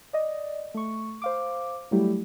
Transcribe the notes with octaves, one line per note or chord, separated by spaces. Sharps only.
D5 D#5
A3 C#6
C5 F5 D6
F#3 G3 A3 E4 G4